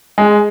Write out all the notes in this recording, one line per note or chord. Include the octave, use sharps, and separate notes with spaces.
G#3